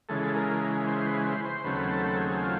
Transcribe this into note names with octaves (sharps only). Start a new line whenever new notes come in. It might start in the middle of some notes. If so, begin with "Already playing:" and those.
C#3 E3 G#3 A4
A#4
C5
B4
C5
C5
D#2 C#3 F#3 A3 C4 B4
A4
A4
G#4
F4